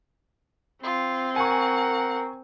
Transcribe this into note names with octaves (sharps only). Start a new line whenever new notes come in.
C4 F4
A#4 F#5 G#5 C#6